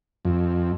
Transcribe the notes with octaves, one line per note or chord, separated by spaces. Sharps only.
F2